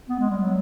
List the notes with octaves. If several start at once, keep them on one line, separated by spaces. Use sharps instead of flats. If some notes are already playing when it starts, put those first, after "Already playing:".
B3
G#3
G3
F#3